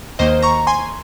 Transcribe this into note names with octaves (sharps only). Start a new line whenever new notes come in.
D#2 D#3 A#3 D#4 C5 D#5
A#5 C#6
G#5 C6